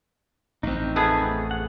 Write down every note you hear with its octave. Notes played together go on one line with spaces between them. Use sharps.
A1 F2 C4 D#4
A3 B3 G#4
F#5